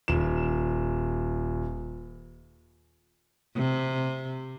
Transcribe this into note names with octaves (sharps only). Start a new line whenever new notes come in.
D#1 E7
C3